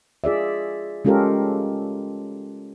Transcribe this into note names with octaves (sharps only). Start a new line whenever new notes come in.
F4 G#4 D5 E5
G#3 C#4 F4 G4 A4 A#4